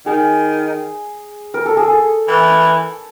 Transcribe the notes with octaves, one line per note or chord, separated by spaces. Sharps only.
D#3 G#4
A#4
A4
G#4
A4
E3